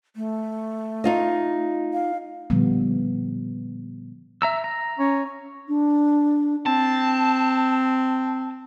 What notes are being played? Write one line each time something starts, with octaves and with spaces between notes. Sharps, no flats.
A3
D#4 F4 D#5
F5
A#2 D3 F3 G3 B3
E5 A#5 E6
A#5
C#4
D4
C4 A5